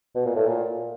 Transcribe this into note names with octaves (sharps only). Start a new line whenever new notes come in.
B2
A#2
A2
A#2